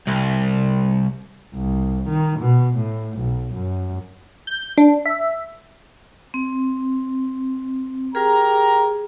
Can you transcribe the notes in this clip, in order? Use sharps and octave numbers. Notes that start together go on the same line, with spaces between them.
C2
C2
D#3
B2
A2
B1
F#2
G6
D4
E5
C4
G4 G#4 A#4 A#5